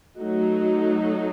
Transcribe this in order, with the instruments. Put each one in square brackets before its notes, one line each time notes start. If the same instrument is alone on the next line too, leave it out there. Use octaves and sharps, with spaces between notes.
[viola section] F#3 A3 D#4 F#4